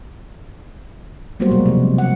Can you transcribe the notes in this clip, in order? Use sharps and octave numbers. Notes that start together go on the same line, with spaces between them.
F#3 G3 A#3 B3 F#4 C5
B2 G#3
C3 F3
F#5